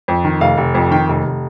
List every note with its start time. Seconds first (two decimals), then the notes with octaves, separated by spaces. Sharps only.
0.08 F2
0.24 D#3
0.41 F1 F5
0.58 F1
0.75 F2
0.91 D#3 G5
1.08 F1
1.24 F1